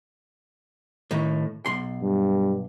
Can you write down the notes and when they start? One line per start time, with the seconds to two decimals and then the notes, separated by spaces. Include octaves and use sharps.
1.11 A2 D#3
1.66 B1 C6
2.02 G2